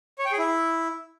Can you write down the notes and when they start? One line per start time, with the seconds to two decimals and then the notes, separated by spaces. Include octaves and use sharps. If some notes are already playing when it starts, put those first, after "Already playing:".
0.19 C#5
0.25 G5
0.32 G#4
0.39 E4